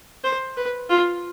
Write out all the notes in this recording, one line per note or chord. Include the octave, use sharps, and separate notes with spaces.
C5
B4
F4